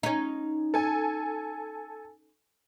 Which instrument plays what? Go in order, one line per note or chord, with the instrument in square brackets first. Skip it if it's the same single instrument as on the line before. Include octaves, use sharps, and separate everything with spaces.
[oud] C#4 D#4
[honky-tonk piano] A4 G#5